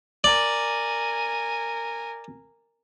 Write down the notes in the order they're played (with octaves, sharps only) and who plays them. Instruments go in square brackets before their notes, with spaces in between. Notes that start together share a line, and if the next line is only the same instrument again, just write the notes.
[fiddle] A#4 G#5 [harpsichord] D5